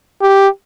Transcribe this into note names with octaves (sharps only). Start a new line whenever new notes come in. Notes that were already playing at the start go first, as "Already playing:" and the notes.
G4